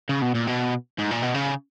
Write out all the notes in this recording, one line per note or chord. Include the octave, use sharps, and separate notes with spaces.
C#3
B2
A#2
B2
G#2
A#2
B2
C#3